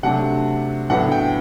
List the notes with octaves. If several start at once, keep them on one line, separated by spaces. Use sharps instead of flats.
C3 F#3 A3 D4 F#5
A2 F#3 B3 D4 F#5
G5